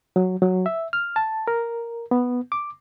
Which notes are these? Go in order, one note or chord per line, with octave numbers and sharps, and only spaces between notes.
F#3
F#3
E5
F6
A5
A#4
B3
D6